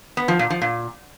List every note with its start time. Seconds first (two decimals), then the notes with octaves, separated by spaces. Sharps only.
0.17 B3
0.28 F3
0.39 A#2
0.50 F3
0.62 A#2